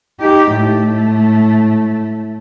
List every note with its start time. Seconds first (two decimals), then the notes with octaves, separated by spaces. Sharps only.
0.21 D#4 G4
0.56 A2 A3